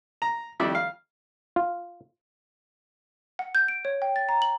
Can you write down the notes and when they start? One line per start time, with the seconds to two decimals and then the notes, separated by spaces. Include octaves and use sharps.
0.22 A#5
0.60 F2 D#3 G3 E4 D5 E5
0.75 F5
1.56 F4
3.39 F#5
3.55 G6
3.68 D7
3.85 C#5
4.02 G5
4.16 A6
4.29 A#5
4.42 F#7